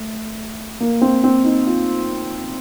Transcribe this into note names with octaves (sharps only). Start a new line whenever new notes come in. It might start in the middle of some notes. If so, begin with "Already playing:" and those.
Already playing: A3
A#3
C4
C4
D#4
F4